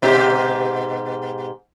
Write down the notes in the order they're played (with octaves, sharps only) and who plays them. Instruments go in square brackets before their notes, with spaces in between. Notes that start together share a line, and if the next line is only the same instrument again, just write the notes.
[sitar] G#2 B2 G4